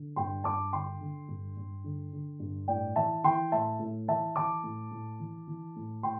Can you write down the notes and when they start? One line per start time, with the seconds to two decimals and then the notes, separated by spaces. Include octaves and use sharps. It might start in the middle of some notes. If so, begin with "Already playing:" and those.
Already playing: D3
0.16 G2 G5 C6
0.44 G2 A5 D6
0.73 D3 G5 C6
1.01 D3
1.28 G2
1.57 G2
1.84 D3
2.13 D3
2.40 G2
2.68 A2 D5 G5
2.96 E3 E5 A5
3.24 E3 G5 C6
3.52 A2 E5 A5
3.79 A2
4.08 E3 E5 A5
4.36 E3 A5 D6
4.64 A2
4.91 A2
5.20 E3
5.47 E3
5.76 A2
6.03 A2 G5 C6